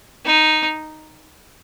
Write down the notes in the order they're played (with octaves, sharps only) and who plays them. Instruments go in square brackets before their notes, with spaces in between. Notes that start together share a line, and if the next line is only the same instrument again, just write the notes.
[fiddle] D#4